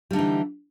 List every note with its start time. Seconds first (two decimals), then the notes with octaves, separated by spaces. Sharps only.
0.11 G3
0.13 D3
0.16 D#4
0.19 E3